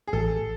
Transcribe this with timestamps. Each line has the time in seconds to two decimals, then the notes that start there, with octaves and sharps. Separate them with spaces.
0.07 G#4
0.13 A1 A4